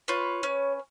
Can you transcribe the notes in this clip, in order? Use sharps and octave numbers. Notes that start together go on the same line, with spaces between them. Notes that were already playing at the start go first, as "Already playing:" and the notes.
F4 B4 C#5
C#4